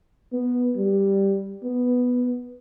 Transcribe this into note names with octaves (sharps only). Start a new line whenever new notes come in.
B3
G3
B3